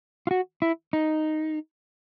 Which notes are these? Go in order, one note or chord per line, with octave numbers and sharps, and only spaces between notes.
F4
F#4
E4
D#4